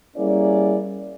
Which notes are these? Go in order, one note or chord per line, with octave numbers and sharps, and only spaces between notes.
G3 A#3 C#4 E4 G#4 D5